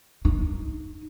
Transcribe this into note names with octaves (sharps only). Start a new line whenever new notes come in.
D#4